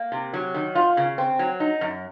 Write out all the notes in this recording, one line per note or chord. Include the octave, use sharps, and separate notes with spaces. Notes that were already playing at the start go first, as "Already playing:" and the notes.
Already playing: A#3
C3
F#3
D#3
F4
C#3
C4
F#3
D#4
F#2